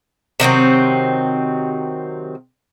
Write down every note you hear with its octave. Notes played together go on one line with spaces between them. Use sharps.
C3 D#3 F#3 C4